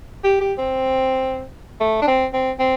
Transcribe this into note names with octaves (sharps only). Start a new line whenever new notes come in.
G4
G4
C4
A3
D4
C4
C4
C4